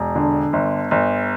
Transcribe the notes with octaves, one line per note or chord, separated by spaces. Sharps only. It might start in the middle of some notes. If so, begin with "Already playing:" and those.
Already playing: E1
D3
G1
G1